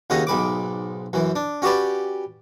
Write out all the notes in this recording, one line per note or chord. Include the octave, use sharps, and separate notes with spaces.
D#2 C#3 C#4 F#4 D#5
B1 G#2 B4 D6
F#2 E3
D4
C#4 F#4 G4 B4 D5